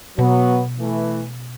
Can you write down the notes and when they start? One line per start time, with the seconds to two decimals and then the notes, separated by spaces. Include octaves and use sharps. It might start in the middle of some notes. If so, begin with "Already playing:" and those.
0.18 B2 F#3 B3
0.79 E3 A3